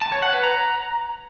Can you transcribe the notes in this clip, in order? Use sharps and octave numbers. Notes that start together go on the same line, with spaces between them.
A5
C#5
F#5
B4
A#5